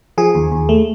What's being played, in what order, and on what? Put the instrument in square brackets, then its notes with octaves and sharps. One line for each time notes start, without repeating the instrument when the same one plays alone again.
[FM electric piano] F3 G#4
D#2
D#2
A3